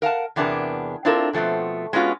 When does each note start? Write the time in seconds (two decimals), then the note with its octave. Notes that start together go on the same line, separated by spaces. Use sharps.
0.02 A#4 F5 F#5 A5
0.36 E2 C3 B3 D4 G#4 A#4
1.05 C4 D4 E4 F4 A4 A#4
1.33 B2 F3 A3 B3 C4
1.93 G#3 B3 C#4 F4 F#4